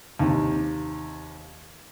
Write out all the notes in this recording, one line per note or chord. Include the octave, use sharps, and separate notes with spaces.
D#2 C3